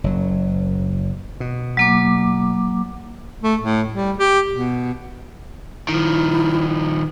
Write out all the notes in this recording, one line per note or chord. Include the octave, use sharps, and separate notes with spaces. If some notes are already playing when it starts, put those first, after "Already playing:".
F#1 F#3
B2
F#3 A#3 D6
A3
A2
G3
G4
B2
D#3 F3 E4